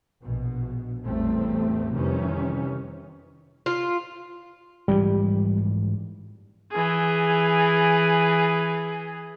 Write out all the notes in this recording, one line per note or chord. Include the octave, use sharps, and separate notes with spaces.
A#1 B2
A1 E2 A2 G3 A3 C4
F2 C3 D#3 E3 G3 C#4
F4
G#2 E3 F3 G3
E3 G#4